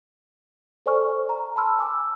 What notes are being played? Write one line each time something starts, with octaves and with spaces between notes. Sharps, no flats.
A4 C5 D5 G#5 C#6 F6
A#5
A5 B5 C6 E6 F6
G#5 D6 E6